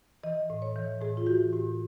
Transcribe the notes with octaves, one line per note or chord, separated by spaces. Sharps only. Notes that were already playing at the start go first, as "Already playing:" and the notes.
E3 D#5
A2
C#5
E3
A2 G#4
F4
E3 F#4
A2 G4